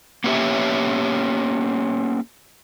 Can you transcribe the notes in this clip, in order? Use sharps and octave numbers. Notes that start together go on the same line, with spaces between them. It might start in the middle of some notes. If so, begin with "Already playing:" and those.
A#3 B3 C#4 G4 C#5 E5